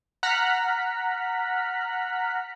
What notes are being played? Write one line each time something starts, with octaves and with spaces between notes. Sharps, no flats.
F#5 A#5 F6 F#6 B6